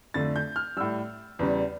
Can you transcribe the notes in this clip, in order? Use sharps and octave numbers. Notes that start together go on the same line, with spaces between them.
F2 D3 A3 A6
G6
F6
A2 G3 E6
E2 C#3 G3